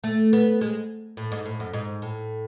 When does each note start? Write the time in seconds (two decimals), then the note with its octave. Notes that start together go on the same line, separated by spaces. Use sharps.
0.04 A3
0.33 B3
0.61 G#3
1.17 A2
1.32 G#2
1.46 A2
1.60 F#2
1.74 G#2
2.02 A2